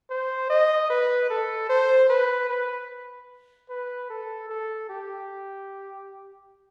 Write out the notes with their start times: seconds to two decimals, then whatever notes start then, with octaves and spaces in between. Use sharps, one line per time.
0.10 C5
0.50 D#5
0.90 B4
1.30 A4
1.69 C5
2.10 B4
2.50 B4
3.69 B4
4.10 A4
4.49 A4
4.89 G4